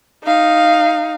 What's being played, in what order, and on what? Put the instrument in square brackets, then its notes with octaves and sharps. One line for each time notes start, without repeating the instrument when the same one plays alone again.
[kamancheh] D#4 F5